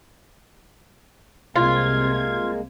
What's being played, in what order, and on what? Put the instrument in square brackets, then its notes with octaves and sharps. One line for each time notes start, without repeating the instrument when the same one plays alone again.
[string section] C2 C3 G#6 [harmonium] G#3 A#3 [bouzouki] F4